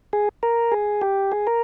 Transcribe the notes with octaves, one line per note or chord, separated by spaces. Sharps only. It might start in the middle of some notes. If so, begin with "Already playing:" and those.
G#4
A#4
G#4
G4
G#4
A#4